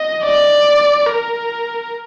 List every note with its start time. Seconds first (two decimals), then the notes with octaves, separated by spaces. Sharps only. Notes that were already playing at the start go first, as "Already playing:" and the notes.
Already playing: D#5
0.24 D5
1.06 A#4